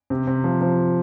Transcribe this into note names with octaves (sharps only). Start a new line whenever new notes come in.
C3
C3
F3
F3